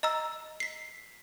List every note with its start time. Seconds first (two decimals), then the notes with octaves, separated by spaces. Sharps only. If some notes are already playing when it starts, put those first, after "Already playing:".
0.03 D#5 A#5 E6
0.60 B6 C7